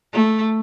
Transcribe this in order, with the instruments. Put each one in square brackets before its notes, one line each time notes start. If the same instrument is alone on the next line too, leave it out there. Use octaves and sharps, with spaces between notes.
[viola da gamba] A3